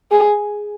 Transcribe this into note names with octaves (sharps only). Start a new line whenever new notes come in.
G#4